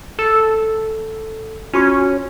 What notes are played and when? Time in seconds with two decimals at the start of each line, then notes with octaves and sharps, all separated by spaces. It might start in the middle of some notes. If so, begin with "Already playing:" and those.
0.19 A4
1.73 C#4 F4 F#4 C#6